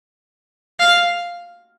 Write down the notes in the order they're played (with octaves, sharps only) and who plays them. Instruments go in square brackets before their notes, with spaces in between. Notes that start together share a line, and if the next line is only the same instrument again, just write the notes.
[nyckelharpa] F5